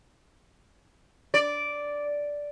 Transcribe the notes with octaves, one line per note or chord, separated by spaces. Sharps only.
D5